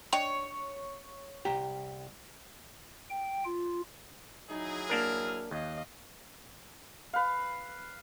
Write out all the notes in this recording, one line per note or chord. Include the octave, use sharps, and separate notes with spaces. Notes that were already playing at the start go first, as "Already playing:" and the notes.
D4 C#5 D#5 G5
C2 G4 A#5
G5
F4
F#3 D#4 E4 G#4
A#3 D4 A#4 F6
D#2 D#5 F5
B4 F5